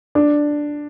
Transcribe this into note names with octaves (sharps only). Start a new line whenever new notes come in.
D4